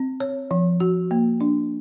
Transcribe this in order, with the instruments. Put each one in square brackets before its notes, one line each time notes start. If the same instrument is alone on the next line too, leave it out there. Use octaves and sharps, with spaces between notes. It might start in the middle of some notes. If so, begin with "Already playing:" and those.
Already playing: [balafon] C4
C#5
F3
F#4
A#3
D4